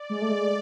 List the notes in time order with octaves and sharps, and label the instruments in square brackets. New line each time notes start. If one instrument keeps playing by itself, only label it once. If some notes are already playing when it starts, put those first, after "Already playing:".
Already playing: [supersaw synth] D5
[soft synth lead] G#3
A3
G#3